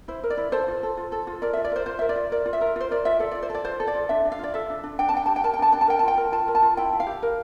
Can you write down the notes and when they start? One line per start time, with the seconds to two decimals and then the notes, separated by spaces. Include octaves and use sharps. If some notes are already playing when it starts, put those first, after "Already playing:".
0.08 E4 C5
0.23 A#4
0.30 D5
0.37 E4
0.52 A4 C5
0.68 F4
0.83 A4
0.97 F4
1.12 A4
1.27 F4
1.42 A#4 D5
1.53 F4 E5
1.64 D5
1.72 A#4 C5
1.86 F4 C5
1.99 A#4 E5
2.09 D5
2.16 F4
2.32 A#4 D5
2.46 F4
2.53 E5
2.61 A#4
2.76 F4 C5
2.91 A#4 D5
3.05 F4 E5
3.20 A4 D5
3.31 F4 D5
3.42 C5
3.50 A4 D5
3.65 F4 C5
3.80 A4
3.87 D5
3.95 F4
4.09 D4 E5
4.25 D4
4.32 F5
4.39 F4 D5
4.54 A4 E5
4.70 D4
4.83 D4
4.99 D4 G5
5.09 A5
5.14 D4 G5
5.26 G4 A5
5.36 G5
5.44 A#4 A5
5.54 G5
5.59 D4 A5
5.72 D4 G5
5.81 A5
5.88 A#4 G5
5.99 A5
6.03 F4 G5
6.17 A#4
6.32 F4 A5
6.48 A#4
6.55 A5
6.63 F4
6.77 E4 G5
6.93 E4
7.00 F5
7.07 G4
7.22 A#4